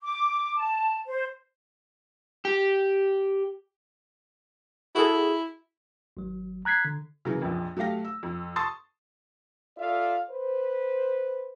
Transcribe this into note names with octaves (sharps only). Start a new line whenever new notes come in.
D6
A5
C5
G4
E4 F#4 G#4 A4
G#1 F#3
A#5 F#6 G#6 B6 C7
D3
C#3 E3 F#3 A#3
A#1 F2
F#3 A3 G4 F5 A#6
E6
F2
A5 C6 C#6 D#6 A6
F4 A4 D5 E5 F5
B4 C5